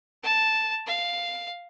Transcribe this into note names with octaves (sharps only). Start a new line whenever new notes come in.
A5
F5